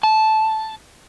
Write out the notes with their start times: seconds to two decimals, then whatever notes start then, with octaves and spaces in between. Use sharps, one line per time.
0.03 A5